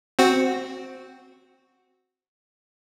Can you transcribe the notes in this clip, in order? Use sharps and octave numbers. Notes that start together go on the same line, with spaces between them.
C4 F#4